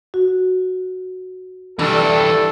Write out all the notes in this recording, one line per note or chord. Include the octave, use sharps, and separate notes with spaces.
F#4
G2 E3 D4 A4